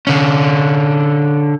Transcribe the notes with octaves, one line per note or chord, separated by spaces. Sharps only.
D3 C#4